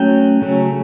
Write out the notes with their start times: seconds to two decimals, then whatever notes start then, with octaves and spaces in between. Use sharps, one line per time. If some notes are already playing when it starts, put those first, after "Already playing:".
Already playing: F#3 A3 C#4 G5
0.42 C#3 F#3 A3 C#4